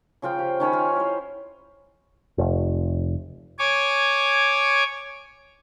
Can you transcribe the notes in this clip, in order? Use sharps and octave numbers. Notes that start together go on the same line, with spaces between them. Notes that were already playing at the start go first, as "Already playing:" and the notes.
C#3 F3 F4 G5
G4
D#3 C#4 C#5 B5
F4
E4 C5
F1
C#5 G#5 D6